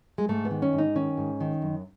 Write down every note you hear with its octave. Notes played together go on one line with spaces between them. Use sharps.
G#3
G#2 A3
B3
D#3
C#4
G#2
D#4
D#3 C#4
G#2
D#3
F#2